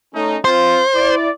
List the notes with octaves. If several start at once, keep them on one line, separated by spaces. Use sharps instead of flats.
A3 C#4 D#4
C4 F4 C5
E4 D5